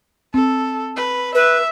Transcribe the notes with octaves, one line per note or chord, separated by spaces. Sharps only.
C4 A4
B4
B4 E5